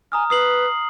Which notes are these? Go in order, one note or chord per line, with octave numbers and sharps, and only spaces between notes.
G#5 A#5 D#6 F6
B4 D#6 C7 F#7